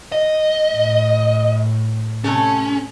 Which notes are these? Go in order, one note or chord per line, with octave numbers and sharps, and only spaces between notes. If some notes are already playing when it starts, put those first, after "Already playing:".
D#5
A2
C3 A3 C#4 A4